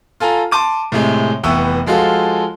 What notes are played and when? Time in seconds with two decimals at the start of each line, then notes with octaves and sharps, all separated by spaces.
0.20 F4 A4 G#5 A#5
0.51 A5 C6 D6 D#7
0.92 A2 C3 G#3
1.43 F1 E3 B3 G5 C#6 E6
1.86 F3 G#3 F4 F#4 A4